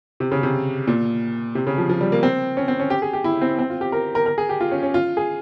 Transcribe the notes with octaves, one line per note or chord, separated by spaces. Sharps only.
C3
C#3
C3
A#2
C3
C#3
F3
F3
G3
A#3
C4
C#4
C4
C#4
G4
G#4
G4
E4
C4
C4
F4
G4
A#4
A#4
A#4
G#4
G4
F4
C#4
C#4
F4
G#4